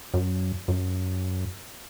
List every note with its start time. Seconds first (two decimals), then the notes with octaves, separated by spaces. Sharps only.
0.14 F#2
0.68 F#2